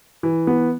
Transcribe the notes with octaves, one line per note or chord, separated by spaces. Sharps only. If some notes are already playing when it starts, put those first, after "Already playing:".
E3
B3